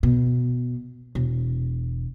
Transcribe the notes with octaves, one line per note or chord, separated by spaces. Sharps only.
B2
E1